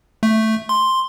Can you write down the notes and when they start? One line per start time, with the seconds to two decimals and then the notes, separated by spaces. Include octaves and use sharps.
0.23 A3
0.69 C6